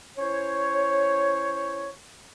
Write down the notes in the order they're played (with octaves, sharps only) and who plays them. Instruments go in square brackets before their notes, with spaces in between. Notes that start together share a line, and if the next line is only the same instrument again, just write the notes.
[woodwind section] C#4 E4 C5 C#5